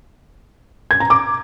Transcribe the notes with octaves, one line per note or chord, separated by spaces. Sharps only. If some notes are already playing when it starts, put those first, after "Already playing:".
G#6
A#5
D6